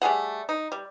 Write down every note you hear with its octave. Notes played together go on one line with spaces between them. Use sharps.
G3 A3 G#4 F#5
D#4
G3